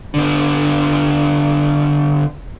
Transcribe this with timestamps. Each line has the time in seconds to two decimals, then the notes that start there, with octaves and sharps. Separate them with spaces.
0.14 D3 B3